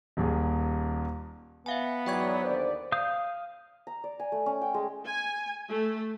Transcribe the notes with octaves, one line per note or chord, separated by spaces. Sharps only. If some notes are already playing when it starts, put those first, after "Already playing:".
D#1 D#2 G#4
B3 E5 F5 G#5
G#2 E3 F#3 D5 G5 C#6 G#6
D#2 D3 C5 D5
F5 D#6 G6
A#5
D5
G#5
A3
C#4
G5
G#3
G#5
A3